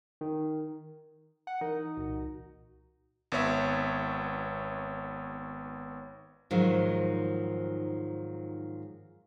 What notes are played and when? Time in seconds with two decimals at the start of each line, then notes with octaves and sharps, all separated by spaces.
0.21 D#3
1.47 F#5
1.61 E3 D#4 A#4
1.96 C2 A#2 F#4
3.32 G#1 B3 C#5 E5
6.51 G#2 D#3 F3 F#3